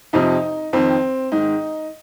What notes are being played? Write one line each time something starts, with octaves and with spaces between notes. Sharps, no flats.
F2 C3 F3 D#4
F2 D#3 C4
G#2 D#3 D#4